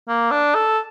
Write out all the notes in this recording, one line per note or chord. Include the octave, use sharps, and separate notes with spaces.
A#3
D4
A4